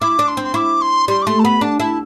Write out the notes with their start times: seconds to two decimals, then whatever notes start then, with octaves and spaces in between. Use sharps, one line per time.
0.01 E4 D6
0.19 D4
0.28 C6
0.37 C4
0.44 C6
0.54 E4 D6
0.81 C6
1.08 G3 C6
1.22 D6
1.26 A3 C6
1.39 A5
1.44 B3 B5
1.61 D4 A5
1.79 E4 A5